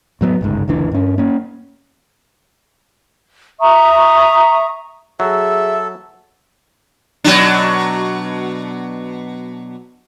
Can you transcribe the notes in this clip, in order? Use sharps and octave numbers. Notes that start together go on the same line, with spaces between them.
A2 F#3 A#3 B3
G1 C#2 G#2
F#1 D2 E3 D4
G2 C#4
A#3 C#4
E5 A#5 C#6 D#6
F#3 G#4 A4 E5
B2 F#3 D4